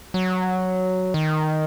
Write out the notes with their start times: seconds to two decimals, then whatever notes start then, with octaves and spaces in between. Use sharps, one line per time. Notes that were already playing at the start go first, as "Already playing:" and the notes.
0.14 F#3
1.14 D#3